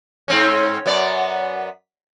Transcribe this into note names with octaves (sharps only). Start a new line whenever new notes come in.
G#2 C4 C#4
F#2 B3 D5